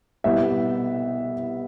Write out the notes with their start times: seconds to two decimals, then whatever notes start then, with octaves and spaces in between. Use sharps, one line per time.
0.24 C2 B2 G3 B3 E4 E5